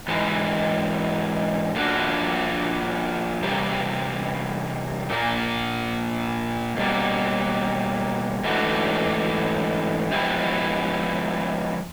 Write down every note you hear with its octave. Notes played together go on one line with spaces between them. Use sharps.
G#2 E3 G#3
F3 A#3 D4 F#4
E2 C3 G3 A#3
A#2 F3 A#3
B2 G3 A#3
G#2 E3 A3 D4 F#4
F3 G#3 B3 E4 G4